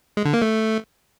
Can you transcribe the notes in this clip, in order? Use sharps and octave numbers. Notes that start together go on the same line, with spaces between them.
G#3
D3
A#3
A3